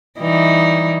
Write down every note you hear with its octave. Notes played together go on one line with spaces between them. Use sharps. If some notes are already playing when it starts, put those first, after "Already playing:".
E3 G3 D#4